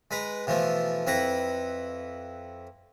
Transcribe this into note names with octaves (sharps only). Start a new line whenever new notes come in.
G#3 B4 A#5
B2 E3 F3 A3
F2 E4 B4 A#5